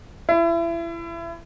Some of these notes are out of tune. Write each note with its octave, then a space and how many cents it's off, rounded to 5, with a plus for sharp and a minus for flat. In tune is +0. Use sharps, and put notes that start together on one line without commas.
E4 +30